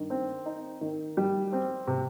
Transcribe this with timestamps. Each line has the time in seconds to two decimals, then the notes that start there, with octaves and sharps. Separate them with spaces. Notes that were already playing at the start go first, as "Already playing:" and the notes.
Already playing: G2 D#3
0.10 C4
0.46 D#4
0.81 D#3
1.17 G3
1.52 C4
1.87 C3